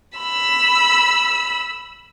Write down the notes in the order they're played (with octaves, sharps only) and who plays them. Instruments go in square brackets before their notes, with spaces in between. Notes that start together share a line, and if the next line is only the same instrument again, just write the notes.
[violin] B5 E6